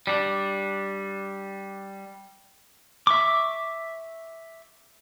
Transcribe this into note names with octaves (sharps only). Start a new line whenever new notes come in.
G3 D4
E5 C#6 D6